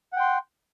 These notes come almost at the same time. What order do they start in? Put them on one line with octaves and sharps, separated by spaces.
F#5 G5 C6